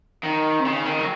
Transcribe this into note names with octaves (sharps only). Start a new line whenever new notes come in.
D#3
C3
C#3
D#3
F#3